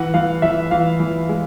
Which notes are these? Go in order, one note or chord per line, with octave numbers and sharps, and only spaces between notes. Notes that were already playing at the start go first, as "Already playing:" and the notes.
Already playing: E3 F#5
E3 F5
E3 E5
E3 F5
E3
G#3